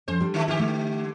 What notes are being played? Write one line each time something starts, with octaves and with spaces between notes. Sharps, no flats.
F2 C#4 C5
G3 D4
D3 F3 G#3
D3 F#4 G4 G#5
A3